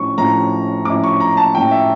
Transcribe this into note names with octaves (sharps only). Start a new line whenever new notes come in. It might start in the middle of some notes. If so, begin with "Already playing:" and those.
Already playing: A2 F3 C#4 E4 C#6
A2 F3 C#4 E4 A#5
A2 F3 C#4 E4 D6
C#6
A#5
A5
A2 F3 C#4 E4 G5
E5